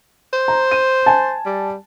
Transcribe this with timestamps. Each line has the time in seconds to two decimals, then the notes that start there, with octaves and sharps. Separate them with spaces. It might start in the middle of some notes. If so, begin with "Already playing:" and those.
0.33 C5
0.48 A#5
0.71 D#7
1.06 G#5 A5
1.46 G3